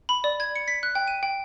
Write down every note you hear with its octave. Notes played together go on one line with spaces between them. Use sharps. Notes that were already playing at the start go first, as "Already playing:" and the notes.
B5
D5
G#6
C#7
B6
F#6
G5
D#7
G5